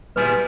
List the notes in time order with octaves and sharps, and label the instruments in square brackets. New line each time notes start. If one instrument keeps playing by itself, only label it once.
[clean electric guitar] A#2 G3 B3 E4 G#4 [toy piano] B4